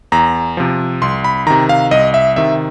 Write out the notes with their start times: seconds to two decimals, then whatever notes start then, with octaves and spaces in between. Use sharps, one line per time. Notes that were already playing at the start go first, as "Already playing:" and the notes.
0.12 E2 A#5
0.57 C3 F3
1.02 C2 C6
1.24 B5
1.47 C3 D#3 A#5
1.69 F5
1.91 C2 D#5
2.14 E5
2.36 C3 D#3 E5